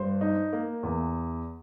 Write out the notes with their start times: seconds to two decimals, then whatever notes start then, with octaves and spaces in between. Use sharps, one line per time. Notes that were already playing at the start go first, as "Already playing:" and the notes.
Already playing: G2 C5
0.21 D#4
0.53 A#3
0.83 E2